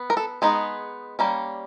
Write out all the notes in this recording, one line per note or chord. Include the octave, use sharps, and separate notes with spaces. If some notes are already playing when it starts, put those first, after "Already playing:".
Already playing: B3
A#4
A4
G#3 B3 D#4 G#4
G3 A#3 C#4